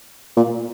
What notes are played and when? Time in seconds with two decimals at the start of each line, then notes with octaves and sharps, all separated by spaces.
0.37 A#2